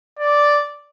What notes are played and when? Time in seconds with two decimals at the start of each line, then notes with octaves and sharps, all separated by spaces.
0.19 D5